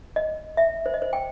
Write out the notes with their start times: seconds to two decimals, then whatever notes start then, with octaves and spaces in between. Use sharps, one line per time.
0.16 D#5
0.57 E5
0.86 C5
0.94 D#5
1.02 C5
1.13 G5